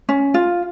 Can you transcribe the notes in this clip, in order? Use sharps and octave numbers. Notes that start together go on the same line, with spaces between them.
C#4
F4